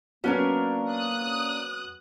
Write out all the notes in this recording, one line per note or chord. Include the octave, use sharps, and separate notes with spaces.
F#3 A#3 B3 C#4 D4 A#4
D#6 F#6